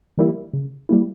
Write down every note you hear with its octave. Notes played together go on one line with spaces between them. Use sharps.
E3 G3 A#3 E4
C#3
G3 A#3 E4